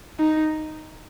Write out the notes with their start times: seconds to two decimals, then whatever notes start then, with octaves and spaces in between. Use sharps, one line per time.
0.19 D#4